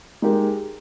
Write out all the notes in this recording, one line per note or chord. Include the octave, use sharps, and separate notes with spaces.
G#3 D#4 G4 A#4